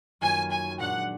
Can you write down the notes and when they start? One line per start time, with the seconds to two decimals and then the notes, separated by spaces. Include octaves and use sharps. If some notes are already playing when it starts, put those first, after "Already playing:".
0.21 F#2 D#3 A#3 F4 B4 G#5
0.51 G#5
0.79 A#2 G#3 D4 F#5